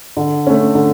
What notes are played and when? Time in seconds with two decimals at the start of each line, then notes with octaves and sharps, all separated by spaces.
0.17 D3
0.47 A3 C#4
0.75 D3